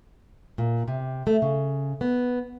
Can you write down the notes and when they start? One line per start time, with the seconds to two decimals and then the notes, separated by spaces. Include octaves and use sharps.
0.58 A#2
0.88 C3
1.27 A3
1.42 C#3
2.01 B3